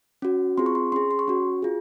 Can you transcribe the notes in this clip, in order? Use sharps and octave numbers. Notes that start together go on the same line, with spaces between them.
C#4 F#4
C4 F4 G#4 C6
C#6
C6
C#4 G#4 C6
C6
C#6
C#4 F#4
F4 G#4